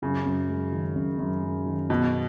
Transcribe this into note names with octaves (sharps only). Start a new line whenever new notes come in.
F#2 C#3
F#2
G#3
D#3
F#2
F#2
G#3
D#3
F#2 B2